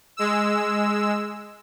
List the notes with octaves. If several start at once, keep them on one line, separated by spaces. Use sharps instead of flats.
G#3 E6